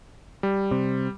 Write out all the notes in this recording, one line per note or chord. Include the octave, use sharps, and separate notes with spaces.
G3
C3